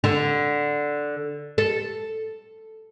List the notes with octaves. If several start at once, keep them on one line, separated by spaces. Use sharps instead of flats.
D3
A4